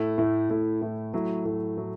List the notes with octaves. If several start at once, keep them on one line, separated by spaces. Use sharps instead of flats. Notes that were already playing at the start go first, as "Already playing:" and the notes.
Already playing: A2 A3 E4
A2 A3 E4
A2 A3 E4
A2 A3 E4
A2 F#3 A3 E4
A2 F#3 A3 E4
A2 F#3 A3 E4